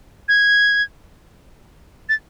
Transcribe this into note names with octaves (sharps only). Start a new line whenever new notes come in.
G#6
A6